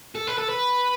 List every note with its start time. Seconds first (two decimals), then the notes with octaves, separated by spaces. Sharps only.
0.15 A4
0.27 B4
0.38 A4
0.49 B4